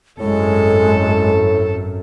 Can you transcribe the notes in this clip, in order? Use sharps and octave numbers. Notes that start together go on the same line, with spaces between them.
G#1 F#2 A2 G#3 A4